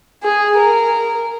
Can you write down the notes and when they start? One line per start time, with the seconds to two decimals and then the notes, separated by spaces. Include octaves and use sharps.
0.23 G#4
0.57 A#4